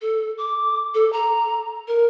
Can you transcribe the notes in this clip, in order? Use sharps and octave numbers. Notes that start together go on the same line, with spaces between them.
A4
D6
A4
A#5
A#4